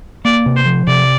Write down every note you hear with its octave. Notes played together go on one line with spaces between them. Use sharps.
A#3 D5
C3
C5
F3
C3 D5